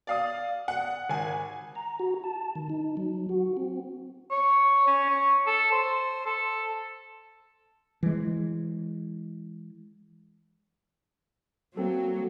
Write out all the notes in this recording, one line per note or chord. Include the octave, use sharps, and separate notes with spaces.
D5 F5 D#6
F#5
G#1 G#5
A#5
F#4
A5
D#3
D#4
F#3
F#4
C4
C#5
C#4
C#5
A4
C5
A4
E3 G#3
F#3 A#3 C4 A4